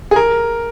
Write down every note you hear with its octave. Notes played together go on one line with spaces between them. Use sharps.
G#4
A#4